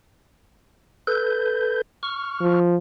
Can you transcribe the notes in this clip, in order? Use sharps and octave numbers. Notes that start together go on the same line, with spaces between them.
A4 B4 G6
C#6 F6
F3